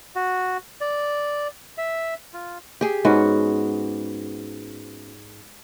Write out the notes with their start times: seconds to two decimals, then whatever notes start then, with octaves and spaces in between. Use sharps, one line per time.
0.15 F#4
0.81 D5
1.78 E5
2.34 F4
2.81 G4 G#4
3.05 G#2 B3 C#4 F#4